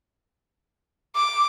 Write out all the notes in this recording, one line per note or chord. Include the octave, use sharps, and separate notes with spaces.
D6